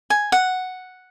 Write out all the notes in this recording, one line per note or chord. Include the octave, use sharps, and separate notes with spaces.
G#5
F#5